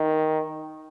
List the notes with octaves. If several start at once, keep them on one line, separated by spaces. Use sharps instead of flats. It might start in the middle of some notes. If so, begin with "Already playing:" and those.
Already playing: D#3